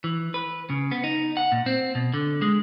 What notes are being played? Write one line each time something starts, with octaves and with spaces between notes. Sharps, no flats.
E3
B4
C#3
B3
D#4
F#5
A#2
C4
B2
D3
G#3